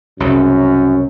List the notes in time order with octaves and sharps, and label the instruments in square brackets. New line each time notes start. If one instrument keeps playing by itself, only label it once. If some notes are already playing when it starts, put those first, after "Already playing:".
[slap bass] C2 C#3 [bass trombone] F#2